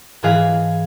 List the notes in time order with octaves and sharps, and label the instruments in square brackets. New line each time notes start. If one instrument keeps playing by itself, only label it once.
[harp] G#2 E3 G#4 F5 G#5 B6